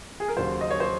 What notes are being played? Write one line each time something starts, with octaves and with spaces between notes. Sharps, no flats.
G#4
A#4
D#2 C#3 F#3 C5
D#5
C#5
C5